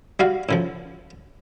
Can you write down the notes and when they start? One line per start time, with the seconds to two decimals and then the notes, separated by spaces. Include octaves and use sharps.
0.19 G3 F#4 F5
0.49 A2 C#3 F3